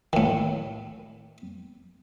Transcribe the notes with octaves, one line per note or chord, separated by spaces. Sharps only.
A2 D#3